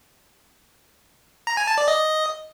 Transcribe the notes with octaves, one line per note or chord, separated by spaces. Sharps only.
A#5
G#5
A5
D5
D#5